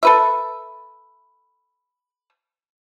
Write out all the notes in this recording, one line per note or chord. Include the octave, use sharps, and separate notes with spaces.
A4 B4 E5